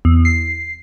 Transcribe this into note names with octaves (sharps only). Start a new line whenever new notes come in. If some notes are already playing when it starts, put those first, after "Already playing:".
E2
C7